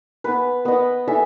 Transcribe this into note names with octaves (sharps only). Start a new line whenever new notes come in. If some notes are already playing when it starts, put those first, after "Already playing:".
B3 B4
B3 D#5
A4 E5 G#5